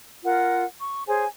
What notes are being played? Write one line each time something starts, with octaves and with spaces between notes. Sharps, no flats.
F4 A#4 F#5
C#6
G#4 C5 C#5 G#5